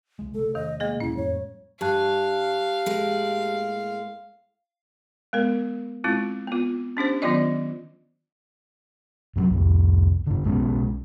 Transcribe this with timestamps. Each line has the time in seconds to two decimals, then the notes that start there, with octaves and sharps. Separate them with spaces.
0.19 C2 G#3
0.35 C3 A3 A4
0.55 E2 D#3 D#5
0.80 G#3 A#3 G#4 D#5
1.00 D#2 A#2 C#4 E4
1.17 F2 A2 G3 C#5
1.81 G2 G4 F5 A5 F#6
2.86 A2 G#3 A#3
5.33 G#3 B3 A#4
6.04 G#3 C4 E4 F4
6.47 B3 F4
6.97 C#4 D4 G4 C5
7.22 D#3 F#3 B3 F4 D5 D#5
9.36 G2 F3 F#3
9.50 C2 F2
10.27 G2 D3
10.44 B1 G#3 B3 C#4